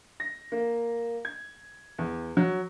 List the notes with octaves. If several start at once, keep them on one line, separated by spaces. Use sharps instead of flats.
A#6
A#3
G#6
E2
F#3